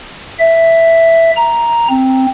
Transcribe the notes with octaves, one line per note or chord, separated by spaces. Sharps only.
E5
A#5
C4